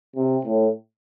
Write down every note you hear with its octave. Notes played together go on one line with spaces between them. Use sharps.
C3
A2